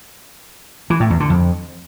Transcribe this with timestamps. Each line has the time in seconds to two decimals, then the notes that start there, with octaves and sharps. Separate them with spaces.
0.90 E3
1.00 A2
1.10 E2
1.20 D3
1.30 F2